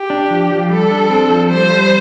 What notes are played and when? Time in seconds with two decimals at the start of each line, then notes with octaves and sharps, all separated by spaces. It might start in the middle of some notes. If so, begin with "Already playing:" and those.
Already playing: G4
0.10 D4
0.30 F3
0.51 F3
0.70 G3 A4
0.91 D4
1.10 C4
1.30 F3
1.50 G3 C5
1.71 G3